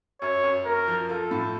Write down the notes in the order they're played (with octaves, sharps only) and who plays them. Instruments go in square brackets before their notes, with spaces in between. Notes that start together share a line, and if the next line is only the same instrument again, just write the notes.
[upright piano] F#2 [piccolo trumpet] C#5
[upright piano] F#2
[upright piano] A#3 [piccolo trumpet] A#4
[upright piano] F3
[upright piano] F4 [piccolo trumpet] A4
[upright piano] A2